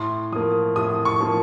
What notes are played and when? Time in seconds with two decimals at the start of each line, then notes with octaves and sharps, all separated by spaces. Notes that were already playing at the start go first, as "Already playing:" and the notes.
Already playing: A2 C6
0.32 F3 A#3 D#6
0.76 A2 D#6
1.05 C#6
1.20 F3 A#3